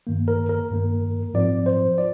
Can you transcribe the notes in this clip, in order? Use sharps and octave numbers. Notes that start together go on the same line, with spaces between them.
G2 D#3 A#3
A#4
A#4
G2 D#3 A#3
G#2 F3 C4 F4 D5
C5
F4 D5